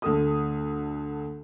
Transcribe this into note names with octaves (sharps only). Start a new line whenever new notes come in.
D2 A4 D#6